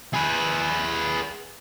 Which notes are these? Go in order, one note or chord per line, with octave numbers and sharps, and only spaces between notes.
G#4 B4